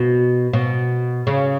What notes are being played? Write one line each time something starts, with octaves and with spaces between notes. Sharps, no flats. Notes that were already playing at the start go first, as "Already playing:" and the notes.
Already playing: B2
B2
C#3